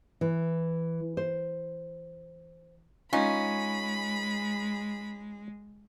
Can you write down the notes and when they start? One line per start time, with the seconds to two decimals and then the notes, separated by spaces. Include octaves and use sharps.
0.21 E3
1.17 C5
3.13 G#3 C#4 D#4 F4 B5